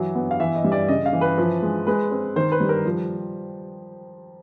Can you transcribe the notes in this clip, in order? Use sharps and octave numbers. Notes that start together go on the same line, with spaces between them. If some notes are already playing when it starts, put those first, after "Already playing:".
Already playing: E3 F#3
B3
F5
E3 E5
D#5
G3
D5
C#3 D#5
F5
E3
B4
F3
G#3
G#3 B4
C4
D#3 C5
B4
G3
A#4
F3